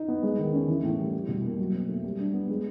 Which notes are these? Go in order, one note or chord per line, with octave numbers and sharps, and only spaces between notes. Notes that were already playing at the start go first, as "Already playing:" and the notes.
Already playing: D#4
B3
G#3
D#3
C#4
E3
A2
G3
G3
B2
A#3
F#3
C4
A3
G3
D4
B3
G#3